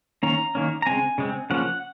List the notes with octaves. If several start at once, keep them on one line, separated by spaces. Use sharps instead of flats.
D#3 A#3 C#4 A#5
D#3 A#3 C#4
A#5
C#3 G#3 C4 G#5
C#3 G#3 C4
C#3 F3 A#3 C#4 F#5